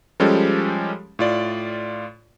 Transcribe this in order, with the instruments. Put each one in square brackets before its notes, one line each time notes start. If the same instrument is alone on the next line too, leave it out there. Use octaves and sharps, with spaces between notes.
[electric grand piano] F3 G3 G#3 C#4 G4 A4
A2 F4 D5